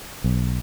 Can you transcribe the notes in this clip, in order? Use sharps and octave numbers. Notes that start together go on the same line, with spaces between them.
B1